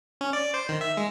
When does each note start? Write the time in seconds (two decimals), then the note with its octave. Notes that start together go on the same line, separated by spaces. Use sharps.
0.21 C#4
0.33 D5
0.54 C5
0.69 D#3
0.81 E5
0.97 G#3